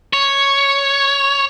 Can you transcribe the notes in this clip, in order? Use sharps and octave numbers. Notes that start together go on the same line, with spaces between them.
C#5